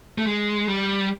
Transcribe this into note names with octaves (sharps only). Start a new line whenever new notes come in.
A3
G#3
G3